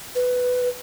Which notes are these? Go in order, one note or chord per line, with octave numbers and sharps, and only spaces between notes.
B4